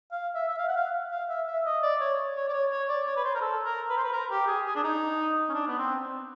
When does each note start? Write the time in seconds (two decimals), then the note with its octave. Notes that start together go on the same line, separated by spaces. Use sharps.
0.12 F5
0.35 E5
0.49 E5
0.58 F5
0.68 F#5
0.77 F5
1.11 F5
1.29 E5
1.47 E5
1.65 D#5
1.83 D5
2.01 C#5
2.36 C#5
2.48 D5
2.53 C#5
2.71 C#5
2.89 D5
3.06 C#5
3.17 B4
3.24 C5
3.35 A#4
3.41 A4
3.65 A#4
3.89 B4
3.97 C5
4.04 B4
4.12 A#4
4.31 G4
4.48 G#4
4.66 G#4
4.76 D4
4.84 D#4
5.50 C#4
5.54 D4
5.68 B3
5.78 C4